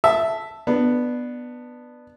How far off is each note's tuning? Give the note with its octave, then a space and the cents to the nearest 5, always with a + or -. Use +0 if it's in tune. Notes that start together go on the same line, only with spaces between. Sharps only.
E5 +0 A5 +0
B3 +0 D4 +15